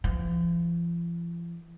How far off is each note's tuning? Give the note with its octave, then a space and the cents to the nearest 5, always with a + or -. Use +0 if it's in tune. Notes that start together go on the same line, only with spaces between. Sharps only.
F3 -45